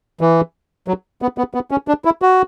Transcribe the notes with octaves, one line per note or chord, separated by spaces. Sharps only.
E3
F#3
B3
B3
B3
C#4
D4
E4
F#4